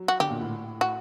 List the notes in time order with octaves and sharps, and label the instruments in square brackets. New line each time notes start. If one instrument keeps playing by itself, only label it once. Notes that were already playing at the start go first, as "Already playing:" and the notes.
Already playing: [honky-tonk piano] F#3
[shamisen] F#4
[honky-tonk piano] D3 [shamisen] G4
[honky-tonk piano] A#2
A2
[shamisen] F#4